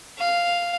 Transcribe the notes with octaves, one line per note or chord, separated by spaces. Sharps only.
F5